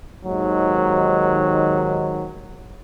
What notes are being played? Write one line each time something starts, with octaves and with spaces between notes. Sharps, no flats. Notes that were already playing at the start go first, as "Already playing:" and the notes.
D#2 G#2 D#3 F#3